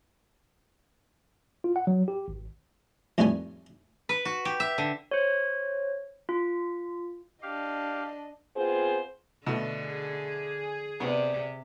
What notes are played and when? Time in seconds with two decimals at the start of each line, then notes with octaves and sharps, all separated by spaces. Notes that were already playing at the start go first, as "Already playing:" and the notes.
1.64 F4
1.76 F#5
1.87 F#3
2.08 G4
2.28 G#1
3.18 F2 A2 D#3 G3 B4 G#5
4.09 B4
4.25 F#4
4.45 G4
4.60 E5
4.78 D3
5.11 C5 C#5
6.29 F4
7.42 D4 G4 D#5 F5
8.56 B3 C4 F4 G#4 C5
9.46 B2 D3 A3
9.83 G#4
11.00 C3 B3 D4 C5 D5